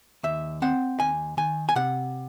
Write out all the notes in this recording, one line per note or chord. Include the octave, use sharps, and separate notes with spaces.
D#2 E5
C4 F#5
D#2 G#5
D#3 G#5
G#5
C3 F#5